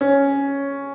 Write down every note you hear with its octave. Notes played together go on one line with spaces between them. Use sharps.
C#4